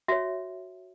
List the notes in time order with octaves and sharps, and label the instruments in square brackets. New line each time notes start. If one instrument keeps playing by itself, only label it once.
[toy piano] F#4 C#5 E5